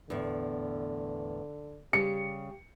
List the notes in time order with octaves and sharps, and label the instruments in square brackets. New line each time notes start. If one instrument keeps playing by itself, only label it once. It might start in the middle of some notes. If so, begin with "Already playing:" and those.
[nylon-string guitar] E2 A2 [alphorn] D3
[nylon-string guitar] C#3 G3 [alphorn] G4 [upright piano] C#7